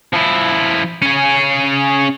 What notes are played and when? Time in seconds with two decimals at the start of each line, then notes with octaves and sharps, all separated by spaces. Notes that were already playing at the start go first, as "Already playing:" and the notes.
0.13 F3 E4
1.02 C#4 G#4